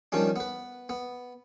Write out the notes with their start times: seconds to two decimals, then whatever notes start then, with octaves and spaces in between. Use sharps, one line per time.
0.12 D#3 F3 G3 C#4 D4
0.36 B3 B4
0.89 B3